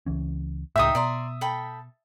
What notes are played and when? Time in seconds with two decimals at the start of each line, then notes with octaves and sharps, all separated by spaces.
0.06 C#2 E3 C#4
0.76 C#2 A2 D#4 E4 E5 G5 D#6
0.95 B2 D5 A#5 C6
1.41 A4 G5 B5